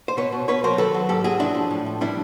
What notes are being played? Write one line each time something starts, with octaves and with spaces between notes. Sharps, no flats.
C5
B2 B4 C#5
B2
B2 B4 C#5
F#3 A#4 C5
D#3 A4 B4
F#3
G#2 G4 A4
F#3 F#4 G#4
F3 D4 E4
F3
A2
F3
G3 D4 E4